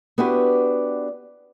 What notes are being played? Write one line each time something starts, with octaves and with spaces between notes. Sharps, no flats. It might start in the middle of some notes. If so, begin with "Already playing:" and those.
B3 D4 E4 F#4 G4 B4